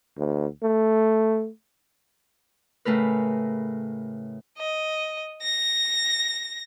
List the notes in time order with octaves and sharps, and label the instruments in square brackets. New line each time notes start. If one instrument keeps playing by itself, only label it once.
[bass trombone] D2
A3
[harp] A2 C#3 A3 A#4 B4
[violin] D#5
A#6